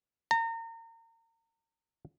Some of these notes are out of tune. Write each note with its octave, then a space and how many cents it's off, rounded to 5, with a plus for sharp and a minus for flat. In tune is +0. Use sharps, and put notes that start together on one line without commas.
A#5 -35